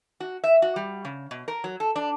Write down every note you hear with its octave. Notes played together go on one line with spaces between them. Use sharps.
F#4
E5
F#4
G3
C#3
B2
A#4
F#3
A4
D4